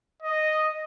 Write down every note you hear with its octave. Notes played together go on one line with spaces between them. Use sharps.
D#5